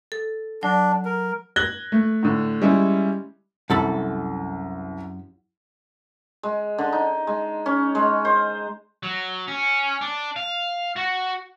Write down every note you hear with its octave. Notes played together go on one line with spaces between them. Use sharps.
A4
F#3 D4
A#4
F#6 G#6 A#6 F#7 G7
A3
A2 D3
G3 G#3 C#4 E4
C2 F#2 A4 B5
G#3
D3
D#4
G#3
C#4
G#3
C5
F#3
C#4
D4
F5
F#4